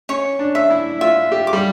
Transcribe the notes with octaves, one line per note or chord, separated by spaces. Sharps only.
C#4 C#5
D4
E5
E4
F4 E5
G4
D6
G3